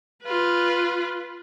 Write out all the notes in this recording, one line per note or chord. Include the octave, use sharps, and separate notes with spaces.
F4 B4